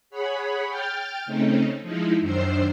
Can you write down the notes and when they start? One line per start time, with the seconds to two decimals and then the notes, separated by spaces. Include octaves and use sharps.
0.10 G#4 C#5 F#5 B5
0.68 G5 F6 G6 A6
1.26 C#3 A3 C4 C#4 D#4
1.82 F3 G#3 D#4 E4
2.20 F#2 D#3 D4 C5 E6 C7